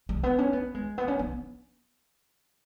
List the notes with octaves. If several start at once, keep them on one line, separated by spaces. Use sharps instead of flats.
G#3
B3
C#4
B3
G#3
B3
C#4
B3